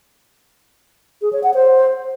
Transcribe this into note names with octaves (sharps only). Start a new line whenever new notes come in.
G#4
C#5
F#5
C5